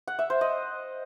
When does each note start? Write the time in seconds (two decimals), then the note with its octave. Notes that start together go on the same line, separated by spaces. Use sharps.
0.07 F#5
0.19 E5
0.30 C5
0.41 D#5